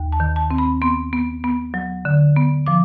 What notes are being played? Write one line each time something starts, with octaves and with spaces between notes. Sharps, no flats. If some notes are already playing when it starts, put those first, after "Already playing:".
Already playing: D#2
A5
D#3
A5
C4
B5
B3 C6
B3
B3
F#3
D3
B3
F3 D6